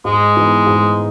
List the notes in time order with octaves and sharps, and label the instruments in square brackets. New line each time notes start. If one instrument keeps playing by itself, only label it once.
[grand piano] G#2 [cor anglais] G#3
[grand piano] E3 B3 D#4
G#2